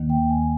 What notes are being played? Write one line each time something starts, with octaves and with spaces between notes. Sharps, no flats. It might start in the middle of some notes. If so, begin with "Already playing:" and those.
Already playing: D#2 D#3 A#3
G5
G#5